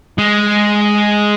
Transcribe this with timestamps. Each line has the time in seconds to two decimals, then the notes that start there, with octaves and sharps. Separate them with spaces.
0.18 G#3